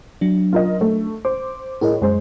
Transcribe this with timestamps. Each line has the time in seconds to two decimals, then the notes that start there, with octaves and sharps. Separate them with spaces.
0.21 F#3 D4
0.53 F4 A#4 D#5
0.81 A3
1.25 C5 D6
1.81 A2 G#4 A#4 D#5
2.02 F#2 G#3 C5